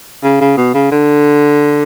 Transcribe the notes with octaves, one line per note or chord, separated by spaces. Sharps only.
C#3
C#3
B2
C#3
D3